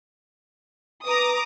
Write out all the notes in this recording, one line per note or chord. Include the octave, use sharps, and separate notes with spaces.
B4 A#5 D6 D#6